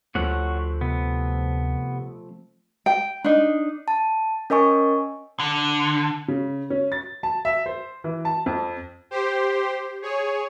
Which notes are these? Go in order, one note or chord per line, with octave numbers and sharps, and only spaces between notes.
D2 F3 A3 C4 F#4 C#5 F#5
C3 B3
G5
D4 D#4
A5
C#4 A#4 D#5 G#5 C#6
D3
C#3
C#4
A6
A5
E5
C5
E3
A5
F2
G4 C5
G#4 C#5